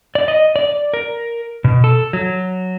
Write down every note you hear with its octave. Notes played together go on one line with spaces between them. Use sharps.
D5
D#5
D5
A#4
B2
A4
F#3